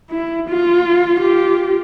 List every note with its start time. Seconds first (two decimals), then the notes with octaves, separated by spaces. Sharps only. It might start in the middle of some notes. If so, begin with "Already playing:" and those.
0.10 E4
0.49 F4
1.19 F4 G4